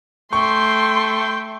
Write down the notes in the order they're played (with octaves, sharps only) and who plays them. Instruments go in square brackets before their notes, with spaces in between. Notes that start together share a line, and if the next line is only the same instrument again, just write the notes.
[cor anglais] A3 [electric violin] G5 G6 [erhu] C6 [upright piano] C#6